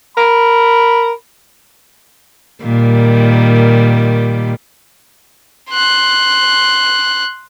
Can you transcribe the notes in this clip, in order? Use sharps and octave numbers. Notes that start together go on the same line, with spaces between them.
A#4 B5
A#2 D#3 G3
C6 F#6